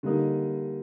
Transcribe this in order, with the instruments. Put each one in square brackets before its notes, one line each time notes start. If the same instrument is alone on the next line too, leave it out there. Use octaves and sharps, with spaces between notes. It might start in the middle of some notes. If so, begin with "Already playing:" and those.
[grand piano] D3 G3 A#3 D#4